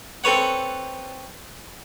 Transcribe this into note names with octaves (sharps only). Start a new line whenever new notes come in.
C4 A4 B4 C#5 F#5